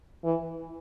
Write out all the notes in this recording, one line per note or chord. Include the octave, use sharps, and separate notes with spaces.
E3